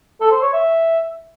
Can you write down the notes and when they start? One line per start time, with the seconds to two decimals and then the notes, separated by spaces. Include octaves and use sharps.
0.20 A4
0.31 C5
0.42 C#5
0.53 E5